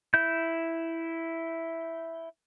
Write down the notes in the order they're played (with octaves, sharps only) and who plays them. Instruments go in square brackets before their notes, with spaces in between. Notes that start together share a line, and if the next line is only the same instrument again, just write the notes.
[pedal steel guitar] E4 G6